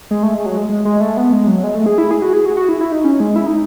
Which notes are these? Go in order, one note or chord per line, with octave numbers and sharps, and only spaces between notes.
G#3
A3
G#3
F#3
G#3
G#3
G#3
A3
B3
G#3
F#3
G#3
A3
G#4
E4
G#4
F#4
G#4
F#4
F#4
E4
E4
D#4
C#4
G#3
E4
D#4